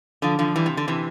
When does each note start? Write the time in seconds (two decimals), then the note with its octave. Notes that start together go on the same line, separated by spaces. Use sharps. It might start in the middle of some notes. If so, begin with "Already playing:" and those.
0.22 D3 F3
0.39 D3 F3
0.56 E3 G3
0.66 C3
0.77 D3
0.88 C3 E3